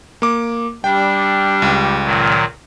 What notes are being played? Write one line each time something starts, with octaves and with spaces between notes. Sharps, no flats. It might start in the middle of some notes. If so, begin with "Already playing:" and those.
A#3 D6
G3 D4 G5
C#2
A#2 D#3 F#3